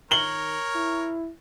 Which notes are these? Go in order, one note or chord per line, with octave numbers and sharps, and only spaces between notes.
D#3 A#4 C#5 F#7 G7
E4